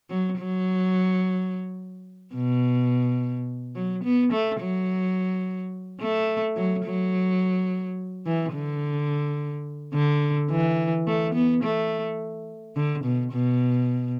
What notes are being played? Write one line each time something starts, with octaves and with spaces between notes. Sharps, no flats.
F#3
F#3
B2
F#3
B3
A3
F#3
A3
F#3
F#3
E3
D3
D3
E3
A3
B3
A3
D3
B2
B2